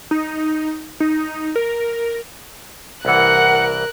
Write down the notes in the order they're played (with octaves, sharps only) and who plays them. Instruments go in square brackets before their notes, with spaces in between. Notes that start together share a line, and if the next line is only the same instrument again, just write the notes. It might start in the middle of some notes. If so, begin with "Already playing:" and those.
[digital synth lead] D#4
D#4
A#4
[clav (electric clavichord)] C2 E3 [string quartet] A#4 F#6 [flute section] F#5